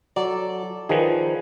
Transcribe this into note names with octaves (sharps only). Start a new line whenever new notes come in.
F#3 A4 D5
D#3 F3 G#4 B4